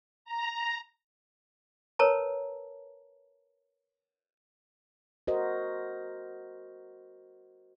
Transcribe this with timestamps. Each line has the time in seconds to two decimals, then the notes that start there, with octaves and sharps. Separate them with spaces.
0.25 A#5
1.99 A#4 B4 C#5 A5 A#5
5.27 F#4 A#4 C5 D#5